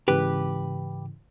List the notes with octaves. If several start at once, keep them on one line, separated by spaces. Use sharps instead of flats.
G#2 C#3 E3 G4 B4